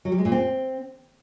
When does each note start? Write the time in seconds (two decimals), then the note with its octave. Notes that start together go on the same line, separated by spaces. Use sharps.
0.05 F#3
0.12 G3
0.18 G#3
0.25 A#2
0.32 C4